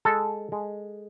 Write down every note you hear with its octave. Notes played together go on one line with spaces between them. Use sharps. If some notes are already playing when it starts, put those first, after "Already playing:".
G#3 A4
G#3